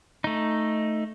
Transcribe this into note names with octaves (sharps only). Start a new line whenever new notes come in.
A3 D#4